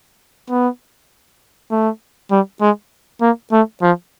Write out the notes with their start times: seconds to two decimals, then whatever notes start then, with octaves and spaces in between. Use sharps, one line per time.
0.50 B3
1.71 A3
2.31 G3
2.61 G#3
3.21 A#3
3.52 A3
3.82 F3